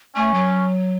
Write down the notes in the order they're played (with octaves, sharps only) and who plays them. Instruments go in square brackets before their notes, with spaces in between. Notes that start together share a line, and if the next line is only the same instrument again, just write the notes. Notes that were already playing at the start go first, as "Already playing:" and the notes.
[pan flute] A3 [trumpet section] C#4
[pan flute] F#3